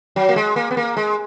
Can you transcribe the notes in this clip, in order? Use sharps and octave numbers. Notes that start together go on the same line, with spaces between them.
F#3
A#3
G#3
A#3
B3
A#3
G#3